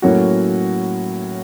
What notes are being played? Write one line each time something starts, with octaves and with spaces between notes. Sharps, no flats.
A2 F#3 A#3 C#4 F#4